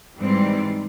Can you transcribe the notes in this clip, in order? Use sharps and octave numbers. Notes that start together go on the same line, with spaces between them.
G#2 E3 G3 C4